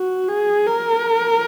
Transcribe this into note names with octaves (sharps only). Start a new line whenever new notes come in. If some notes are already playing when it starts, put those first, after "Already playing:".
Already playing: F#4
G#4
A#4